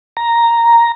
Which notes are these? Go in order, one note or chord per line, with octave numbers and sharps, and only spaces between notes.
A#5